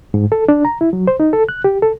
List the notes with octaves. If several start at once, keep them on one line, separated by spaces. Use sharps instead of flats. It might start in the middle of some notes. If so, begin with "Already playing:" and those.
G#2
A4
D4
A#5
E4
F#3
C5
D#4
A4
F#6
G4
A4